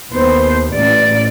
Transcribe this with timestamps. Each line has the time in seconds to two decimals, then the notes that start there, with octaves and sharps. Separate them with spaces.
0.13 D#2 B3 C5
0.75 A1 D5